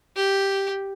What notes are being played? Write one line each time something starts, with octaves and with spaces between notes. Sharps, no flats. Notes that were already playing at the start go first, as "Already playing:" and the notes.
G4